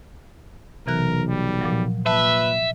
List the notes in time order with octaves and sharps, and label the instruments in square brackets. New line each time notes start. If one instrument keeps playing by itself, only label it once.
[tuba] B1 [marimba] C3 E3 F#6 [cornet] A#4
[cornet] G3
[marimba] A#2 F3 F#3
[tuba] A#2 [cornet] B4 [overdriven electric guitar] E5 [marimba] A5